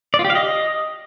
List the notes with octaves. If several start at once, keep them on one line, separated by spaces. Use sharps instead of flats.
D5
F4
G4
F5
D#5